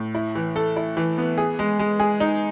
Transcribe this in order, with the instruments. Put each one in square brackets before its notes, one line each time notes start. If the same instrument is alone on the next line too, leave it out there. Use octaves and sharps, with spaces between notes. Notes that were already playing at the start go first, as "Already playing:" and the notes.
Already playing: [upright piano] A2
E4
E3
A4
E4
E3
B3
G#4
G#3
G#3
G#4
D#4